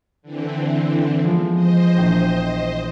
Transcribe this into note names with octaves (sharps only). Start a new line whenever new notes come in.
D3 E3 C4
F3 G#3 B3
C5 D#5
A#1 E3 G5